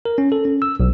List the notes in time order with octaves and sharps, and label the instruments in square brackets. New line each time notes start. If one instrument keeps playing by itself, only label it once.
[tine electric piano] A#4
C#4
A4
C#4
E6
B1